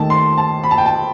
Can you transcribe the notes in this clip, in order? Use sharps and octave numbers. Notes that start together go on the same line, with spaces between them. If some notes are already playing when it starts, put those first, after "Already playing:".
Already playing: D#2 D#3 A3 A5
C6
A5
B5
A5
G5
A5